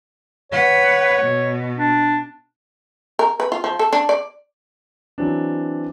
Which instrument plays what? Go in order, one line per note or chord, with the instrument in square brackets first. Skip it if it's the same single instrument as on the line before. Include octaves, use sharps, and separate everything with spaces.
[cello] B4 F#5 [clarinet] C#5
[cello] B2
[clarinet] D4
[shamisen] A#4
B4
F4
F3
A4
D4
D5
[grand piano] E3 F#3 C4 D4